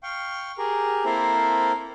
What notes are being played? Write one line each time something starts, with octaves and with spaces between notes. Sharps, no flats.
F5 G5 C#6
G4 G#4 A#4
A#3 C4 E4 A4 A#4 C5